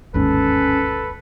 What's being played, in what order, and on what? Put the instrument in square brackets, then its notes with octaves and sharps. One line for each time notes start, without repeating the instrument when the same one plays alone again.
[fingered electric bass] G1 D#2 G#2 [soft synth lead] C#4 [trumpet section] A4 B4